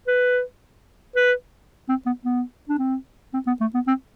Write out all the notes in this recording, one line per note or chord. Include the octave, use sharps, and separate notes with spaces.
B4
B4
C4
B3
B3
D4
C4
C4
B3
A3
B3
C4